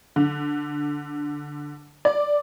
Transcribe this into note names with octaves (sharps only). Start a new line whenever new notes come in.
D3
D5